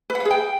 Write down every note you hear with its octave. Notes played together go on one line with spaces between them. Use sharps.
B4
F#5
F5
G#4
G5